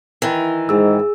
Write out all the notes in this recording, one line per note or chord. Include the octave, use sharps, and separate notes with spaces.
D#3 E3
G#2 G#4 E6